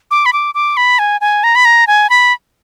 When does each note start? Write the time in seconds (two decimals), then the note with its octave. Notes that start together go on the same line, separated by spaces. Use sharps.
0.11 D6
0.26 B5
0.33 D6
0.55 D6
0.77 B5
0.99 G#5
1.21 G#5
1.44 A#5
1.55 B5
1.65 A#5
1.87 G#5
2.10 B5